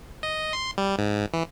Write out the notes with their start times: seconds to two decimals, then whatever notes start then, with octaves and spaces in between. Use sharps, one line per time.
0.23 D#5
0.53 C6
0.78 G3
0.98 G#2
1.34 E3